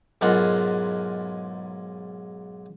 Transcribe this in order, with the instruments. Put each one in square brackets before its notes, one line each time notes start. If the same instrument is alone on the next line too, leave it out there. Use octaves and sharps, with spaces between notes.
[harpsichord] B1 G#2 F4 A#4 F#5 B5